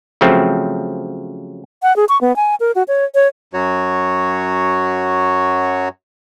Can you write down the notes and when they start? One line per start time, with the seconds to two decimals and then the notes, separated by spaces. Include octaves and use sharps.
0.21 C#3 F3 F#3 A3 C4
1.83 F#5
1.96 G#4
2.09 C#6
2.21 B3
2.36 G#5
2.60 A#4
2.75 F#4
2.88 C#5
3.15 C#5
3.53 F#2 F#3 F#4 C#5